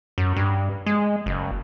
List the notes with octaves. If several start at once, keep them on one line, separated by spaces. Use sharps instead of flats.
F#2
G2
G#3
F#1